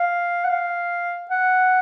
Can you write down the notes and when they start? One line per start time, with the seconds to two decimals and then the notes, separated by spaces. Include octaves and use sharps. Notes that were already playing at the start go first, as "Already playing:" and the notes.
Already playing: F5
0.45 F#5
0.50 F5
1.31 F#5